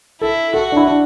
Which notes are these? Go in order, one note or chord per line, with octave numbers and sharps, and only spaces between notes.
E4 A4
F#4 A4
D4
E4
D4